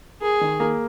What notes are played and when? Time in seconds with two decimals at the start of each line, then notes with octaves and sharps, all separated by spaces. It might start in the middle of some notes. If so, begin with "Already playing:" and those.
0.22 G#4 A#4
0.41 D#3
0.60 A#3